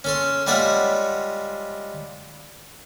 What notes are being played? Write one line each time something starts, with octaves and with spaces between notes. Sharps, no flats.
C#4 A4 C6
G3 G#3 F4 C#5 E5 F#5